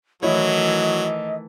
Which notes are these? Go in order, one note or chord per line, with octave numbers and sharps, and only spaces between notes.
D#3 E3 F#3 A3 E4 C#5 D#5